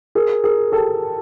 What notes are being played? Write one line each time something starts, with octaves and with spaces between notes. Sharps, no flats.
G#4 A#4
G#4 A#4
G4 A4